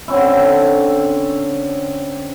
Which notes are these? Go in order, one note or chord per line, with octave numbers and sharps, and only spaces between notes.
D3 C4 C#4 E4